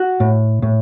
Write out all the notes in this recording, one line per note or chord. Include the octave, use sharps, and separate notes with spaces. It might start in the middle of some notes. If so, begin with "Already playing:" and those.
Already playing: F#4
A2
A2